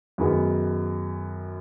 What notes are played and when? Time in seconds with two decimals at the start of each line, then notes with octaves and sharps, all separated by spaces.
0.18 F#2 D#3 B3 G#4